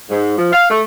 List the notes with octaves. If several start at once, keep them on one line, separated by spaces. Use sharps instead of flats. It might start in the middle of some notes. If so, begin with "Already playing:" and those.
G#2
F3
F5
A3